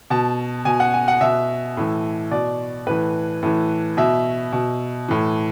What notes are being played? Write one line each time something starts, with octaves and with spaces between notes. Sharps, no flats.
B2 A5
B2 G#5
F#5
G#5
F#5
B2 E5
A2 E3
B2 D5
A2 E3 B4
A2 E3
B2 E5
B2
A2 E3